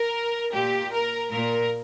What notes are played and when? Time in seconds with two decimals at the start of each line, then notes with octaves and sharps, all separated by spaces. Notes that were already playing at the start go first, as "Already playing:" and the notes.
Already playing: A#4
0.54 A#2 G4
0.93 A#4
1.32 A#2 A#4